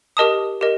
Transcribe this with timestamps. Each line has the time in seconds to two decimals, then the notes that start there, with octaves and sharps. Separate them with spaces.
0.17 G4 A#4 D#5 A5 D#6
0.61 G4 A#4 D#5